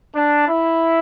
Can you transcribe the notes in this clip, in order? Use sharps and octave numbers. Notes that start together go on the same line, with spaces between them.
D4
E4